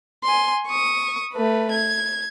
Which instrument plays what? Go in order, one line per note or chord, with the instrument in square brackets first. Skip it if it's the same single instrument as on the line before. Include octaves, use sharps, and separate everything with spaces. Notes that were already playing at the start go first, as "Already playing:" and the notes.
[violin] G#5 C6
C#6 D#6
A3 B4
G#6